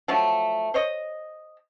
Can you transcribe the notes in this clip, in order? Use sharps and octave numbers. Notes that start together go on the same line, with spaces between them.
F3 F#3 A3
C5 C#5 D#5